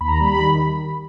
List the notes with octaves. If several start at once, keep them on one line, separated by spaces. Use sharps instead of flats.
D#2 B5
A#5
G3 B5
D#3